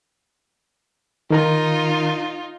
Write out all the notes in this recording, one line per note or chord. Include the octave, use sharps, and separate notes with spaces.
D#3 D#4 F4 A#4 A#5